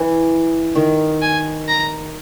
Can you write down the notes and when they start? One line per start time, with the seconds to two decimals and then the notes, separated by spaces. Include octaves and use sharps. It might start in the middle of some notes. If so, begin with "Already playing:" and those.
Already playing: E3
0.75 D#3
1.22 G#5
1.68 A#5